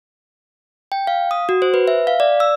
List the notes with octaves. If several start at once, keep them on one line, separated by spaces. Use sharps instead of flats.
G5
F5
D#6
F#4
C5
B4
E5
F5
D5
E6